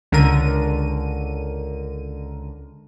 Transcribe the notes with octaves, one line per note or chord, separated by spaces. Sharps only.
C#2 D3 A#4 D#7